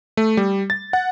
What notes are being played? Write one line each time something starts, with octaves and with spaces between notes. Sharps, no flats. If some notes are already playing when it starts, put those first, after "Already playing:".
A3
G3
A6
F#5